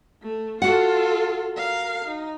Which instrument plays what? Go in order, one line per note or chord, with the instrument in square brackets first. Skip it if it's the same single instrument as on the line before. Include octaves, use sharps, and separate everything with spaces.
[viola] A3
[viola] F4 A4 [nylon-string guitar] F#4 F#5
[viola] A#4 F5
D#4